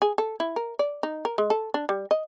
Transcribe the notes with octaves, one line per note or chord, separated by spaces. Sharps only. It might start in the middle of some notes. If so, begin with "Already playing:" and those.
G#4
A4
E4
A#4
D5
D#4
A#4
G#3
A4
D4
G3
D#5